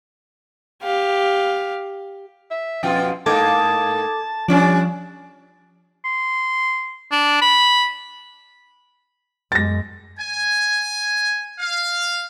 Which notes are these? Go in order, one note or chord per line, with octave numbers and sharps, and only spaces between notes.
G4 F5
E5
F2 B2 F4 G5
G#2 A#3 D#4 A4 A5 D6 G#6
F3 G3 C#4 D4 D5
C6
D4
B5
F#2 G#3 A6 A#6
G#5
F5